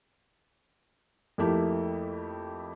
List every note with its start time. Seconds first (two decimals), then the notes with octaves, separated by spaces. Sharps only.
1.38 F2 A3 A#3 E4 G4